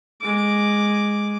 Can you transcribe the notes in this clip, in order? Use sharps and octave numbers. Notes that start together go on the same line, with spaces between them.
G#3 D6